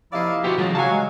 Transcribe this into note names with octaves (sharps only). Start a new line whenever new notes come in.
C3 F3 A#3 E4 D5 D#5 F5
B2 F3 B3 F#4 G4
C#3 E3 F#3 G#3 F4
C#3 F#3 G3 F#4 F5 G#5 A5
G#3